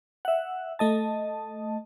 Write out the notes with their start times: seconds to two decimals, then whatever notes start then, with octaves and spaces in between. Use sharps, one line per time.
0.25 E5 F#5
0.79 A3 D#5 A5